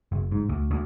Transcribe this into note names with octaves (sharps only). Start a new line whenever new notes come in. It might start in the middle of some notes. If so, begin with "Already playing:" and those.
F#1
G#2
D2
D2